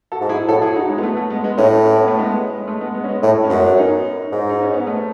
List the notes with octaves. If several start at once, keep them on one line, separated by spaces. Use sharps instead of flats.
F#4 A4
G#2
E4 G#4
A2 F#4 A4
E4 G#4
D#4 F#4
G#3
B3
A3
B3
A3
G#3 B3
G#3 B3
A2 A3 C#4
C#4
B3
A3
G#3 B3
G#3
A3
G#3 B3
G#3 B3
C#4
G#3 B3
A2 A3
C#4
F#2 G#3 B3
C#4
B3 D#4
G#2
D#4
C#4
B3
A3